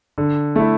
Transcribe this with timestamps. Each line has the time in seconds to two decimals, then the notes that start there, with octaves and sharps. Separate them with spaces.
0.18 D3
0.56 A3 E4